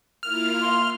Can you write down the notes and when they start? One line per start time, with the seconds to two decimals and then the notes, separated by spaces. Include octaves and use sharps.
0.23 A#3 E4 F4 F6
0.61 C6